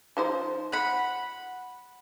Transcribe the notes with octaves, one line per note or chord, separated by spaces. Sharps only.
F3 D#4 C5
F#5 B5